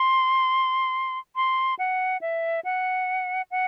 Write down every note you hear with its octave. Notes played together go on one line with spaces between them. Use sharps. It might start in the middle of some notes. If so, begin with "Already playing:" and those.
Already playing: C6
C6
F#5
E5
F#5
F#5